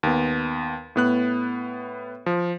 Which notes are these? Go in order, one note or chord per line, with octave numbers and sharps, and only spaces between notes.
D#2 B3
A2 B3 F#6
F3